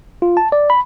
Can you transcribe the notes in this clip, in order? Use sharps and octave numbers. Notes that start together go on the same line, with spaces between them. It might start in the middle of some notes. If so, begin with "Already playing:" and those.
F4
A5
D5
B5